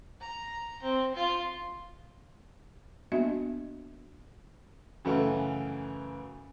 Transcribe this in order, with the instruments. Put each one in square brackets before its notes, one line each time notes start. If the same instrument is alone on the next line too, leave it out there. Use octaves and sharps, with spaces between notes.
[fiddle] A#5
C4
F4
[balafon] A#3 B3 D4 F#4 D#5 E5
[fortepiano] F#2 C#3 E3 A3